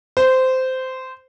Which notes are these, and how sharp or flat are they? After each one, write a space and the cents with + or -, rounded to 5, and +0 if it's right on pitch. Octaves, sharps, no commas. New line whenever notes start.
C5 -15